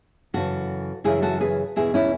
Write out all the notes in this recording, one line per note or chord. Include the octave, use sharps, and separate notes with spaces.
F#2 C#3 E3 F#4 A4
F#2 C#3 E3 E4 G#4
F#4 A4
G#4 B4
E2 B2 E4 G#4
C#4 E4